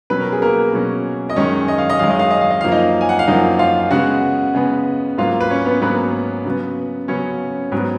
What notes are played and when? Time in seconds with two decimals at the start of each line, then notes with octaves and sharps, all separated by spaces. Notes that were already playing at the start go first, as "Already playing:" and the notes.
0.10 B2 F#3 C#4 B4
0.20 A#4
0.32 G#4
0.42 A#3 A#4
0.73 B2 F#3 C#4
1.30 D#5
1.36 F#2 D#3 G#3 C#4 C#5
1.68 D#5
1.78 F5
1.90 D#5
1.99 F#2 D#3 G#3 F5
2.10 D#5
2.19 F5
2.31 D#5
2.41 F5
2.51 D#5
2.61 F#2 F3 A#3 F5
2.72 D#4 D#5
3.01 G#5
3.09 F#5
3.19 F5
3.27 F#2 F3 A#3 D#4 D#5
3.59 F4 F5
3.91 C#3 G#3 B3 F#4 F#5
4.54 C#3 G#3 B3
5.18 G#2 F#3 A#3 F4 F5
5.40 B4
5.50 C#4 C#5
5.66 B3 B4
5.81 G#2 F#3 A#3 B3 B4
6.45 C#3 F#3 B3
7.08 C#3 F#3 B3 C#4 C#5
7.72 G#2 F#3 B3